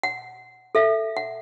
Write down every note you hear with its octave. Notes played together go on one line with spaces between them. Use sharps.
F#5
A4 E5 F5
F#5